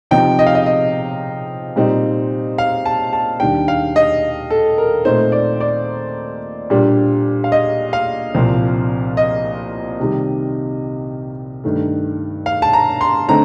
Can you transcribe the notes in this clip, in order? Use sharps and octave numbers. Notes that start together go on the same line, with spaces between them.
C3 F3 C4 D#4 G5
D#5
F5
D#5
D#5
A#2 G3 C4 D#4
F5
A5
A5
D#2 D#3 G3 D4 G5
F5
D#5
A4
A#4
A#2 A3 C4 D#4 C5
D5
D5
A#2 G3 D4
F5
D#5
F5
C2 A#2 F3 C4
D#5
C3 D#3 G3
G2 D#3 A3
F5
A5
A#5
C6
D3 A3 C4 D#4 A#5